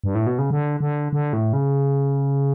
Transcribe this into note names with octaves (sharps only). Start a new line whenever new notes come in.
G2
A2
B2
C#3
D3
D3
D3
A2
C#3